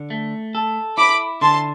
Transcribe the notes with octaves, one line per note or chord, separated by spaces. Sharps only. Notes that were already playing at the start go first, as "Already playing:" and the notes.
Already playing: D3
A3
A4
E4 B5 D6
D3 A5 C6